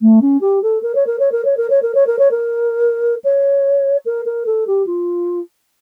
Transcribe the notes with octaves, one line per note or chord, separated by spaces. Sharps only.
A3
C#4
G4
A4
A#4
C#5
A#4
C#5
A#4
C#5
A#4
C#5
A#4
C#5
A#4
C#5
A#4
C#5
A#4
A#4
A4
G4
F4